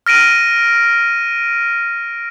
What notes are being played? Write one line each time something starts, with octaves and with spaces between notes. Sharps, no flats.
F6 A#6 D7 D#7